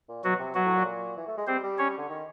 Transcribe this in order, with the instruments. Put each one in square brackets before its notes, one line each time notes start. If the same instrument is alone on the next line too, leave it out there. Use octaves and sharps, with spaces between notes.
[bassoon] A#2
[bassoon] B2 [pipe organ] F#3 F#4
[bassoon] C3
[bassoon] B2 [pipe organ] F#3 F#4
[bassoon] A2
A#2
E3
A3
G#3
[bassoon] G3 [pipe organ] C4 C5
[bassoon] G3
[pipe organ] C#4 C#5
[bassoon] D3
D#3